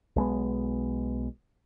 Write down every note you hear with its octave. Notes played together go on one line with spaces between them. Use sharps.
B1 G#3 B3